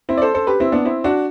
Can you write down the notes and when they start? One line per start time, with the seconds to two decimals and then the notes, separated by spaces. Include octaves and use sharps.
0.09 C4 E4
0.18 D5
0.22 A4 C5
0.34 A4 C5
0.47 G4 B4
0.60 C4 E4
0.72 B3 D4
0.85 C4 E4
1.04 D4 F#4